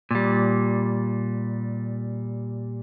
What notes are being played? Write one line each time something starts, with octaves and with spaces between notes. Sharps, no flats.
A#2 G3